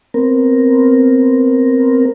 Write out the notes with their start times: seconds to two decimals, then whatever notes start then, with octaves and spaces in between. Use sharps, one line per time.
0.14 B3 C4 A#4